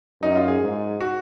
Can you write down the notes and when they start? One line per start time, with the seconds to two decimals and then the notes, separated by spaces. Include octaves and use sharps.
0.22 F#2 D#4
0.35 F4
0.48 G#4
0.61 G#2
1.01 F#4